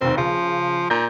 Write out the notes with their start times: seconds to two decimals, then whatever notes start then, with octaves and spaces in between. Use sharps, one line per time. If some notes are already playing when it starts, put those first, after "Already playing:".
0.01 F1 D#2 C4
0.17 C#3 F3
0.90 A#2 A#5 G6